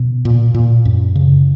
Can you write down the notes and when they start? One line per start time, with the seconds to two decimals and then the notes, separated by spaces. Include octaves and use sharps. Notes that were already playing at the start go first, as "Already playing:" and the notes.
Already playing: B2
0.25 A#2
0.54 A#2
0.85 F#2
1.16 C#3